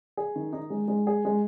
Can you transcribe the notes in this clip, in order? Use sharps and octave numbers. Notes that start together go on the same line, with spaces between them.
G#4
D#3
D#4
G#3
G#3
G#4
G#3